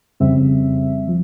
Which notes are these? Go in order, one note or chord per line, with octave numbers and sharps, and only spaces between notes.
F2 C#3 G3 C4 E5
F3